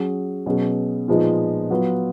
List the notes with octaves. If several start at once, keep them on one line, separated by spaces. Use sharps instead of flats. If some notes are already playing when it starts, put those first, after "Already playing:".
Already playing: F#3 C#4 G#4
B2 F#3 C#4 G#4 B4
A#2 F3 G#3 B3 D#4
F#3 B3 F4